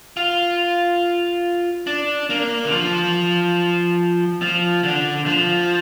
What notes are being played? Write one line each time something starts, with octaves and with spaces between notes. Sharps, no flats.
F4
D4
A#3
D3
F3
F3
D3
F3